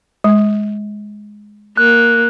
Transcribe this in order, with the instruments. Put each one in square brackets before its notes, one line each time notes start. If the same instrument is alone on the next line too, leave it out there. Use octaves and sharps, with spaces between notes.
[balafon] G#3
[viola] A#3 [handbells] F#6